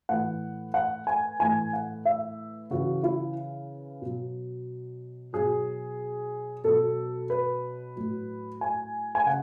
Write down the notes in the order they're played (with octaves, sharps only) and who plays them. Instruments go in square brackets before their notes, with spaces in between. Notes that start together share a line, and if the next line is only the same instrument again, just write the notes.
[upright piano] A2 E3 F#5
F#5
G#5
A2 E3 G#5
F#5
E5
C#3 E3 F#4
E4
B2 F#3
B2 F#3 G#4
B2 F#3 A4
B4
A2 F#3
G#5
G#5
C#3 F#5